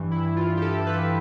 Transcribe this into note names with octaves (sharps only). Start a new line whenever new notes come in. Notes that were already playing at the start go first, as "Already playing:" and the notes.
Already playing: G2 E3
E4
F4
G4
A4
B4